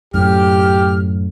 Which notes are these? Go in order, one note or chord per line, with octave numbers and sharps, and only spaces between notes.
F#2 A2 G4 F6